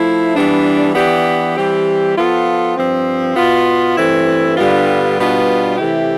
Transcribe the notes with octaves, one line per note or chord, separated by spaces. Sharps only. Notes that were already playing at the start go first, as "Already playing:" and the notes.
Already playing: F3 A3 E4
E3 G3 B3 D4
E3 B3 D4 G4
E3 G3 C4 G4
F3 B3 F4 A4
G2 F3 C4
B2 B3 F4
G2 E3 A3 C4 E4
G2 D3 G3 B3 F4
B2 G3 B3 D4 F4
C3 E3 A3 E4 G4